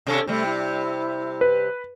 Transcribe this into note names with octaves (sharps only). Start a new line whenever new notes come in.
C3 C#4 D4 A4
C3 G3 A3
E4
B4